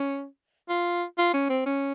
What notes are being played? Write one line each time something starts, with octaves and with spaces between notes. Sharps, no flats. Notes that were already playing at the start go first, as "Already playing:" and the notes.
Already playing: C#4
F4
F4
C#4
C4
C#4